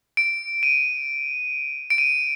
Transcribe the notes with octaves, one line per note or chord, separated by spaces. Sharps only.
D7
D#7
D7
D#7